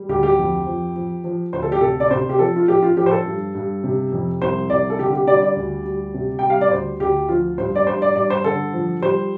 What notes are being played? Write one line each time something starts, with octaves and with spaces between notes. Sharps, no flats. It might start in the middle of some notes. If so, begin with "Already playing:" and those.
Already playing: G3
D2 G4
G4
F2
F3
F3
F3
D2 C5
A4
G4
C3 A4
D5
C3 C5
G4
F3 A4
F4
F3 G4
F4
F3 G4
C5
A4
G2
G2
C3
F2
C2 C5
C2 D5
A4
D3 G4
G4
G3 D5
D5
D2
G3
C3
G3 G5
F5
D5
D2 C5
D2 G4
F3 F4
G2 C5
D5
G2 C5
D5
G2 D5
C5
D3 A4
F3
G3 C5